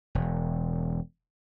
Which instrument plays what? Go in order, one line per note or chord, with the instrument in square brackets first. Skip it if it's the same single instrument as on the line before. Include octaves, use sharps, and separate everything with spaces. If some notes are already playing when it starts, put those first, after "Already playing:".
[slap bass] E1